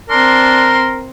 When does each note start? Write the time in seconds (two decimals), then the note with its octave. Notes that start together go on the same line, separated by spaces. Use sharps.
0.10 C4 D4 A#4 C6